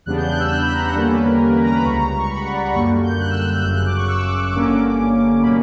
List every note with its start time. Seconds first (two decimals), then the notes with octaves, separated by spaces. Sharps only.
0.06 E2 C#3 G3 B3 D4 F#6
0.17 G6
0.29 F#6
0.39 E6
0.51 F#6
0.62 B5
0.73 A#5
0.84 F#5
0.95 E2 D3 G3 A#3 C#4 D5
1.10 B4
1.25 A#4
1.40 A#4
1.51 B4
1.63 A#5
1.73 B5
1.85 C#2 C#3 G3 C#6
1.96 A#5
2.07 A#5
2.18 C#6
2.30 B5
2.41 F#5
2.52 D5
2.63 B5
2.74 F#2 D3 G3 A#3 C#6
3.03 G6
3.19 F#6
3.30 E6
3.41 F#6
3.53 F#6
3.63 G1 F#2 C#3 G6
3.75 F#6
3.86 D6
3.96 C#6
4.08 E6
4.23 D6
4.38 D6
4.53 G1 G2 D3 A#3 C#4
5.42 B2 F#3 A#3 C#4 B5